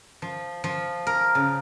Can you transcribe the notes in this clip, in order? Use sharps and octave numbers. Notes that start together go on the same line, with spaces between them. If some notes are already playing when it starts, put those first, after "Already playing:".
F3
F3
A#4
C#3